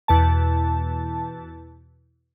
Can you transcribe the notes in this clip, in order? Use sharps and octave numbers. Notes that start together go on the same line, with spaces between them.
E2 B2 A5